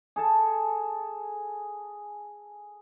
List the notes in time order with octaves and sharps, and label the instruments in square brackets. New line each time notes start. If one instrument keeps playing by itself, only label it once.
[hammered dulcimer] G#4 A4 A5